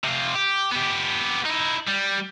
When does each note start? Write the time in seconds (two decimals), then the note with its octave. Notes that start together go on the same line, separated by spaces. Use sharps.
0.04 C3 F4
0.35 G4
0.71 B3 G4
1.46 D#4 E4
1.88 G3